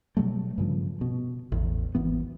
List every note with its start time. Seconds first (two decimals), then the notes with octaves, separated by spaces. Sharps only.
0.17 B2 F#3 G3 A3
0.58 G2 C#3 F3
1.01 B2
1.52 A1 E2
1.95 G#1 E3 B3